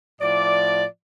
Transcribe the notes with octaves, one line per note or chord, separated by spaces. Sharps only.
A2 F3 D5